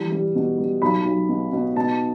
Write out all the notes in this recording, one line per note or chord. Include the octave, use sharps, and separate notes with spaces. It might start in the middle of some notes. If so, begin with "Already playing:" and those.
Already playing: E3 G3
G3
B2
G3
B1 B5
B1
B2
B2
B2 A5